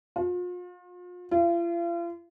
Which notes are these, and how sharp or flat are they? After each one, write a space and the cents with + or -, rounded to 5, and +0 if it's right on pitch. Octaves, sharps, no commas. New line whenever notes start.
F4 +40
F4 -40